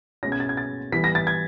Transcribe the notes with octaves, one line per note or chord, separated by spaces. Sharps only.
B2 G#3 C#4 A#6
G#6
A6
G#6
A6
E3 G3 B3 B6
A#6
A6
G#6